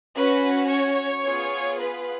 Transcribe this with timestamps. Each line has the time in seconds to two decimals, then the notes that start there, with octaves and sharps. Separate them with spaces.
0.15 C#4 F#4 B4
0.70 C#5
1.24 B3 F4 G#4
1.79 B4